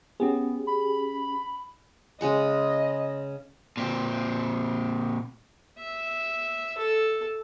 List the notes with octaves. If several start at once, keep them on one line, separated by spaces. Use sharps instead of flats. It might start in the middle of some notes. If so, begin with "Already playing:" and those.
B3 C#4 G4 G#4
B5
C#3 G#3 D#5 C#6
A#2 C4
E5
A4